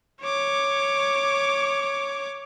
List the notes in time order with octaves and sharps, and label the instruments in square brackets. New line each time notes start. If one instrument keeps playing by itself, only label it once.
[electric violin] C#5 D6